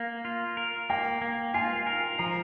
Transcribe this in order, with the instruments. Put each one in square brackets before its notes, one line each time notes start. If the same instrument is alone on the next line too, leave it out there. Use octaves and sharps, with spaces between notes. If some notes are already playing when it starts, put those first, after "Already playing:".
Already playing: [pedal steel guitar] A#3 [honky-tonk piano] F5
[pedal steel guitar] F4
A#4
[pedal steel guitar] A#3 [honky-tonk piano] G5
[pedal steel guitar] A#3
[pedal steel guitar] F4 [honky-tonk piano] G#5
[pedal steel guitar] A#4
[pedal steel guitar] F3 [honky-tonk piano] A#5